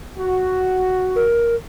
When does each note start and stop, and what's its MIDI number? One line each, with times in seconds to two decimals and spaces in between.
0.18 1.25 66
1.16 1.55 70